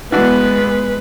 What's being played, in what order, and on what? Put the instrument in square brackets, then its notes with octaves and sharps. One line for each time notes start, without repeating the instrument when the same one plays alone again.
[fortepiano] E3 D4 F#4 [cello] G#3 [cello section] B3 [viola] B4